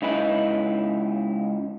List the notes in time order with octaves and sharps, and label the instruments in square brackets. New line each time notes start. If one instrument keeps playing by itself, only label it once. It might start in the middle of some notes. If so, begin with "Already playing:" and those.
[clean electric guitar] C#2 D#4 E4 B4